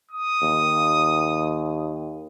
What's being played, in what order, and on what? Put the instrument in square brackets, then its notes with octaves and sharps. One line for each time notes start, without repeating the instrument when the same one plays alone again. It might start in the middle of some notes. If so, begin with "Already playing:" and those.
[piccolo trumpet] D#6
[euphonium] D#2